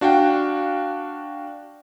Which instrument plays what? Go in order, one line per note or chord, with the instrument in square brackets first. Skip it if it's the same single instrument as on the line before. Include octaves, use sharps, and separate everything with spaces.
[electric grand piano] D4 F#4 F5 G5